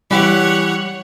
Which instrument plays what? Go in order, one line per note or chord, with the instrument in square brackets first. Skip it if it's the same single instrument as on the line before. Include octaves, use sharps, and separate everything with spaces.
[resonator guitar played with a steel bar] E3 G4 [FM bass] G3 [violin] C#5 F#5